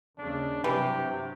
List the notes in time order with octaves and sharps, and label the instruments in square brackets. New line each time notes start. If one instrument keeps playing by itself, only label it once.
[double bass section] D#2 C#3 [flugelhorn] D4
[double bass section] G2 C3 F#3 [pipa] E3 [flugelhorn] G4